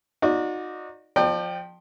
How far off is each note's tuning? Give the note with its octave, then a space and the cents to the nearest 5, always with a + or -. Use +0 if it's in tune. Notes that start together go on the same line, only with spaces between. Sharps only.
D#4 +0 F#4 -30 D5 +0
F3 +15 D5 +45 G5 +0